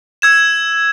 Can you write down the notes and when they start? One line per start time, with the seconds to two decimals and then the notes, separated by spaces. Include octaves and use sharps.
0.22 E6 G#6 E7